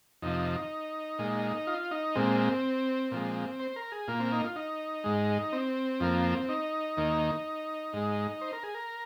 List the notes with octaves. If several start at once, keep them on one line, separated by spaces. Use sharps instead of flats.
F2 C3 F3 D#4
A#2 G#3
F4
D#4
A#2 G#3 C4
A#2 F3 G#3
C5
A#4
G#4
A#2 A#3 F4
C4
D#4
F4
D#4
G#2 G#3
C4
F2 F3 A#3
D#4
D#2 D#3 A#3
G#2 G#3
C5
A#4
G#4
A#4